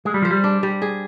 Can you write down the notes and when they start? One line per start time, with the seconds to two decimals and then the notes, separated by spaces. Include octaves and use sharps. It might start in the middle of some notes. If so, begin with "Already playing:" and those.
0.05 G#3 G#4
0.14 G3
0.22 F3 C5
0.31 G3
0.44 D4
0.63 G3
0.82 G#4